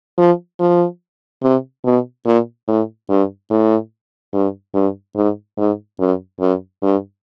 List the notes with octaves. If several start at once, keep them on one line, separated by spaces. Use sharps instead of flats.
F3
F3
C3
B2
A#2
A2
G2
A2
G2
G2
G#2
G#2
F#2
F#2
G2